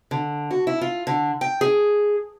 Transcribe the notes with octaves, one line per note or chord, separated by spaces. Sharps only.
D3
F#4
E4
F4
D3
G5
G#4